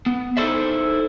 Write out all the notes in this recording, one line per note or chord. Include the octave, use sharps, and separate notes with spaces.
B3
D#4 E4 A4 C5 D5 E5